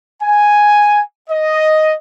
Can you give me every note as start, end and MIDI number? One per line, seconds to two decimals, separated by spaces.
0.22 1.01 80
1.30 1.94 75